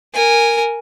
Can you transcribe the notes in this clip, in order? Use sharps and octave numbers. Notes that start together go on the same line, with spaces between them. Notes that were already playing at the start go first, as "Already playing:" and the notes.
A#4 G#5